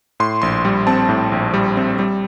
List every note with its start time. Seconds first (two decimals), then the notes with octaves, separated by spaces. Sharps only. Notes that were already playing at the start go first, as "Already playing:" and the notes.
0.20 A2 C6
0.42 A#1 C6
0.65 G3
0.87 C4 A5
1.09 A2
1.32 A#1
1.54 G3
1.77 C4
1.99 G3